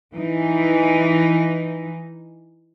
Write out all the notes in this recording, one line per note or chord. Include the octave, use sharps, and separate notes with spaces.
E3 D#4